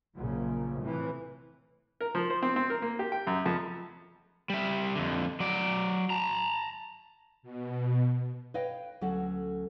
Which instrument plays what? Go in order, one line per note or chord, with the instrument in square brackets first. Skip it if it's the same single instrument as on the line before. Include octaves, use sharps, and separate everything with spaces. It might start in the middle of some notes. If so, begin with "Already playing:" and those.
[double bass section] A#1 F#2 C#3
A2 C3 E3
[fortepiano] A#4
F3
C5
C4
C4
A#4
A#3
G4
G5
F#2
F2
[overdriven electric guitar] G3 E5
F2 D3
F#3 D5
A5 A#5
[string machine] B2
[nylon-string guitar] B4 C#5 D#5 F5 G5
D2 F#3 C#4 A4 F#5